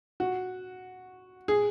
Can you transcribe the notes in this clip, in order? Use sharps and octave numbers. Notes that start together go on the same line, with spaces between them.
F#4
G#4